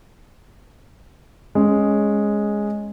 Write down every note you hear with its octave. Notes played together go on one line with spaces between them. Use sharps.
G#3 C#4